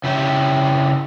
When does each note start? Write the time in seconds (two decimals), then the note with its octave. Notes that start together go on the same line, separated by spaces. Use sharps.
0.04 C#3 E4 G4